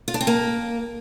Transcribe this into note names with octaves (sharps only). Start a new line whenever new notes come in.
F4
D4
C4
A#3